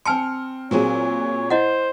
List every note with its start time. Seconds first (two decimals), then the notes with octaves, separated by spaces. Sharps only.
0.06 C4 G#5 A5 C6 F6 C#7
0.71 A#2 F#3 A#3 C4 G#4 C#5
1.50 E4 C5 D#5 F#5